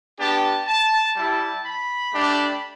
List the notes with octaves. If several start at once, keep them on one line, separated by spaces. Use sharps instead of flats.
B3 D4 G4 A5
A5
G3 E4 G4 A5
B5
A3 D4 G4